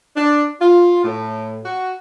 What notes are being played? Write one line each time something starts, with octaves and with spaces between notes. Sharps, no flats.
D4
F4
A2
F#4